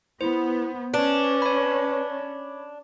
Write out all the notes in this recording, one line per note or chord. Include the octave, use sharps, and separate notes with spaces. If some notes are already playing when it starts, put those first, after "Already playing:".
B3 E4 C5
C#4 D4 B4
C#5 B5